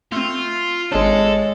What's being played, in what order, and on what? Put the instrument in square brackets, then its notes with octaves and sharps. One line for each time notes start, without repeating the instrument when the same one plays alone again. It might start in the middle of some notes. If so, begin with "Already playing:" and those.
[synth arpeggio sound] A3 C4 [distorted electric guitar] F4
[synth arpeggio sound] G#1 D4 [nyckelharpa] G#3 [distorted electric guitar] A4 [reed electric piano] C#5 D#5